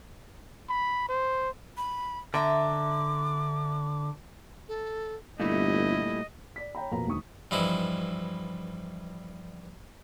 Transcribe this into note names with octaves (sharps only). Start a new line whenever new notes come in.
B5
C5
B5
D3 E5 A#5 D6
A4
G1 A#2 G3 A3 E4 D#5
D5 B6
C#5 G5 A#5 B5
F2 B2 A#3 A#5
E1 D2 D#3 C#6 D#6
G2 E3 F3 D#4 E4